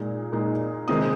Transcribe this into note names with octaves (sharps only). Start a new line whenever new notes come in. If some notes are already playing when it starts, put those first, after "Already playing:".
Already playing: A#2 G#3 D#4
A#2 G#3 D#4
C3 D#3 G#3 C4 D#4 D#6